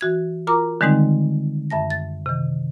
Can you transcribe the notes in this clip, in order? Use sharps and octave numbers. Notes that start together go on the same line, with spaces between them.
E3 F#4 G#6
F4 A#4 A#5 D6
D3 D#3 G3 G#3 C4 D#4
F#2 E5 A5 A#6
A6
C3 D#3